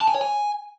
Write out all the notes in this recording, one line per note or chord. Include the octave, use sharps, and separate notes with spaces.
A5
G#5
C#5
G#5